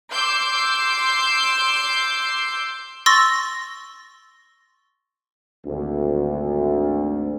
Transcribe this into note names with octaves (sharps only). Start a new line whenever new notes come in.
C6 D6 E6 G6 C7
C6 C#6 E6 A6 A#6
G#1 D2